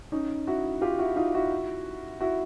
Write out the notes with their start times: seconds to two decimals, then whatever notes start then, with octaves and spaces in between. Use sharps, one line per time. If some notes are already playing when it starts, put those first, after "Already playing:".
0.12 C#4 D#4
0.47 E4 F#4
0.82 F4 G4
0.99 E4 F#4
1.16 D#4 F4
1.35 E4 F#4
2.21 E4 F#4